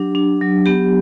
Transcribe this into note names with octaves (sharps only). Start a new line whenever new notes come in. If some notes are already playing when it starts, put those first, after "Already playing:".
Already playing: F#3 D4 G4
D4
F#3
B3 G4